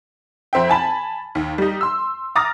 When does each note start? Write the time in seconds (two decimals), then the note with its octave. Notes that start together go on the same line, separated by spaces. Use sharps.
0.53 F2 C4 E5 G5
0.69 G#5 A5 B5
1.35 D#2
1.58 G3 D#4
1.81 C6 E6
2.35 A#5 D6 D#6 F6 A6 A#6